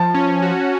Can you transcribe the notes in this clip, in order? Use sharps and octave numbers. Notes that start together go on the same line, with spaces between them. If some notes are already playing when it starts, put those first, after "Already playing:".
Already playing: F3 A5
C#4
F#4